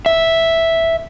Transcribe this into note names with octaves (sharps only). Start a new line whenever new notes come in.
E5